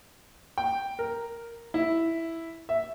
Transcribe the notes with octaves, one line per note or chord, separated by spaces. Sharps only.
G5
A#4
E4
E5